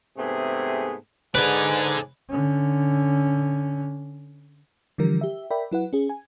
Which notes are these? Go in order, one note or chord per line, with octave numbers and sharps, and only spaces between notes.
G#2 C3 A3 B3 G#4
G#2 A4 B4 D5 G#5
D3 C#4
D3 E3 F3 G3 A#4
G4 E5
A#4 D5 E5 G5 B5
F#3 E4 B4 F#5
C#4 G#4
G#5